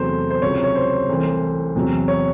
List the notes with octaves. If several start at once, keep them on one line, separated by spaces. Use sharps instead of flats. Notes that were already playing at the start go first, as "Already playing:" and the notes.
Already playing: E2 C3 F#3 A3 C5
C5
C#2 C3 F#3 C#5
C#5
C5
C2 C3 E3 A3
E2 C3 F#3
C#5